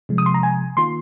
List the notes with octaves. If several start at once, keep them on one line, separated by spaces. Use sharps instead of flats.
C3 F3 G#3
D#6
C6
A#5
G#5
D#3 A#3 F4 C6